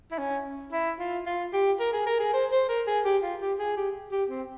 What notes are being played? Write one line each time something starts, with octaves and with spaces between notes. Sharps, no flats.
E4
C#4
E4
F4
F4
G4
A#4
G#4
A#4
G#4
C5
C5
A#4
G#4
G4
F4
G4
G#4
G4
G4
C4